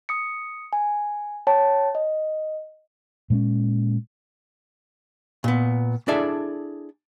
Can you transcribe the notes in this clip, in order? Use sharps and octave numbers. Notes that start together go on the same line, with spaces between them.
D#6 C#7
G#5
C#5 G5 A5
D#5
A#2 G#3 C4 C#4
A#2 B3
D4 E4 G#4 A4 D5 E5